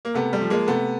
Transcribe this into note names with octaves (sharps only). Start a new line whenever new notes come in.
A#3
C3 A3 B3
G3 A3
F3
G#3 A#3
C3 A3 B3